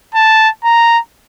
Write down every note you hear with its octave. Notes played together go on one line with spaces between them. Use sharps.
A5
A#5